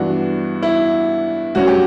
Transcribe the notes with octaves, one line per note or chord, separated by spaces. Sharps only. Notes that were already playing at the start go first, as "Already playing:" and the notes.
Already playing: G2 E3 B3 D4 F#4
E4
G2 F#3 C#4 F#4
G4